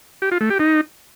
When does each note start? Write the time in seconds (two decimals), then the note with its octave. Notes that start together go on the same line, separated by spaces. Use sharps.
0.22 G4
0.31 F4
0.41 A3
0.50 G4
0.59 D#4